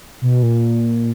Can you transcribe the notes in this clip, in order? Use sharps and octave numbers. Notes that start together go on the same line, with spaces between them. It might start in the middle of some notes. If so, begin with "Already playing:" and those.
B2
A#2